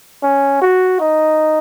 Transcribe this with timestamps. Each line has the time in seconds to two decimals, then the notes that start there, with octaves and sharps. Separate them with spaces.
0.23 C#4
0.62 F#4
1.00 D#4